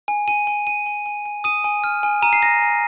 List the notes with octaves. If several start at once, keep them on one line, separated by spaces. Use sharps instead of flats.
G#5
G#5 D#7
G#5
G#5 D#7
G#5
G#5
G#5
D#6 D#7
G#5
F6
G#5
A#5 D#7
C7
A#5 A#6
G#5